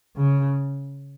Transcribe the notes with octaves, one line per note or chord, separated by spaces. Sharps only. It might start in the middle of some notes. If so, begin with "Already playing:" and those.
C#3